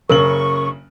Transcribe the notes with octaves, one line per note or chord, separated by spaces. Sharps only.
F#1 C#3 A#4 C#6 F#7